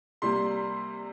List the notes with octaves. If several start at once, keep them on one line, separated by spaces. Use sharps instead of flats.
C3 G3 A#3 C6